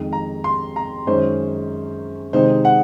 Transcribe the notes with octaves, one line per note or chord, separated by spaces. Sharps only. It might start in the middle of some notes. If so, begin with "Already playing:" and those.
Already playing: F2 D#3 G#3
A#5
C6
A#5
F#2 D#3 G#3 C#4 C5
C3 D#3 G#3 D#4 C5
F#5